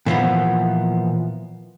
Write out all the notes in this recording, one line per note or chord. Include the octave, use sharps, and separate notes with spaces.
A#2 E3 F3 B3